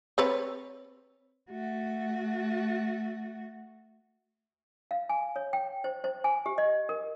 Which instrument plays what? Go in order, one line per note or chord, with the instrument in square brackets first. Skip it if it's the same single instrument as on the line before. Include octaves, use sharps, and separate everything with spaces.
[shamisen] C4 B4 C#5
[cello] A3 F#4
[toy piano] F5
G#5
C#5
G5
C5
C5
G#5
G4
D#5
A#4